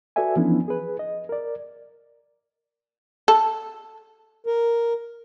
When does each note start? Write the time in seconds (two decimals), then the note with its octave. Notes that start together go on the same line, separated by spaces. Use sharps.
0.16 F#4 A4 B4 D5 E5 G#5
0.36 E3 F3 B3 C#4 D4 E4
0.68 G#4 B4
0.99 D#5
1.29 A#4 D5
3.28 A4
4.46 A#4